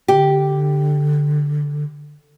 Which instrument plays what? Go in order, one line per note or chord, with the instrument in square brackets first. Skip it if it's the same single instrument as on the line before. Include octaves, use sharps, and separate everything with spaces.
[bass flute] D3 [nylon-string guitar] G4